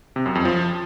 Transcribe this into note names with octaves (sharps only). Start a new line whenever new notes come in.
C3
F#2
F2
F3